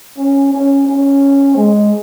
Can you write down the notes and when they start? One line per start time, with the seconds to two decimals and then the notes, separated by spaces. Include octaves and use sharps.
0.18 C#4
0.53 C#4
0.87 C#4
1.56 G#3